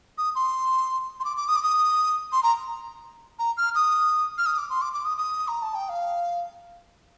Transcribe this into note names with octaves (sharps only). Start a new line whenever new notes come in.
D#6
C6
C6
D6
D6
D#6
D6
D#6
C6
A#5
A#5
F6
D#6
F6
D#6
D6
C6
D6
D6
D#6
D#6
A#5
A5
G5
F5